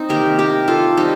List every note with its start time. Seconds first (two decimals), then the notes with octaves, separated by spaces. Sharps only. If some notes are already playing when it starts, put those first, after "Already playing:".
Already playing: C4 D#4
0.09 C3 D#3 A#3 G4 A#4
0.39 G4 A#4
0.68 F4 A4
0.97 C3 G3 D#4 G4